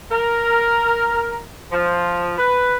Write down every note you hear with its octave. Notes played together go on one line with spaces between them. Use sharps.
A#4
F3
B4